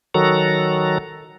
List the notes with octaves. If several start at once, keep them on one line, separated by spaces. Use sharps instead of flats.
D#3 F#3 F#4 A4 A#5